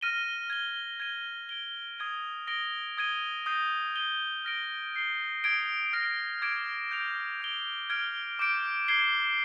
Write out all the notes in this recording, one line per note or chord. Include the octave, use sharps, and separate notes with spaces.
F6 A#6 D#7 G7
G#6 D#7 G7
G#6 D#7 G7
G#6 D7 G7
D#6 G#6 D#7 G7
D#6 A#6 D7 G7
D#6 G#6 D#7 G7
D#6 G6 A#6 D#7 G7
D#6 A#6 D#7 G7
F6 A#6 D7 G7
G6 C7 G7
D#6 G#6 D7 G7
F6 A#6 D7
D6 G#6 D7
G6 D7 F7
D#6 G6 D7 G7
F6 G#6 D7 G7
D6 G6 D7
G#6 C7 G7